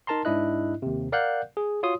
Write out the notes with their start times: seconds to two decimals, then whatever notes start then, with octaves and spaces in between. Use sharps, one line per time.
0.07 D#4 A#4 A5 A#5 C6
0.25 G#2 D4 E4 D#5 F#6
0.82 D#2 C3
1.12 A#4 D5 F5 F#5 F#6 G6
1.57 G#4
1.83 F4 F#4 C#5 C6 D#6